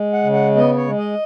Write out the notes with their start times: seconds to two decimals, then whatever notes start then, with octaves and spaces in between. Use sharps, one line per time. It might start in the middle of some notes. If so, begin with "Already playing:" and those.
Already playing: G#3
0.13 F#5
0.24 C#3
0.33 F#5
0.56 B3 D#5
0.76 C#5
0.87 G#3
0.98 D#5